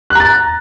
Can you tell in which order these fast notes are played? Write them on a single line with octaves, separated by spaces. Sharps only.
F#6 A#5 A6